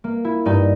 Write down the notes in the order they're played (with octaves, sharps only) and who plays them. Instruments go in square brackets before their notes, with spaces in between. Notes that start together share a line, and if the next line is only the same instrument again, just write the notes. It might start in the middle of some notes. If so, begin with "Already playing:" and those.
[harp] A#3
E4
G2 D#4